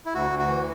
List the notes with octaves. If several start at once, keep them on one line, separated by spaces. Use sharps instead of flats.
E4
D2 F#4
D2
F#4
E3